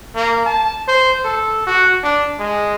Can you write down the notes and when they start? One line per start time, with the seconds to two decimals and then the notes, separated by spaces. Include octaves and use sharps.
0.16 A#3
0.46 A5
0.88 C5
1.25 A4
1.67 F#4
2.03 D4
2.39 G#3